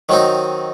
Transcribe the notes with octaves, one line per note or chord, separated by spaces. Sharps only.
D#3 F#3 C4 D#4